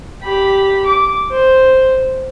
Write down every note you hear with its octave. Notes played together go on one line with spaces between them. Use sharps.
G4 B5
D6
C5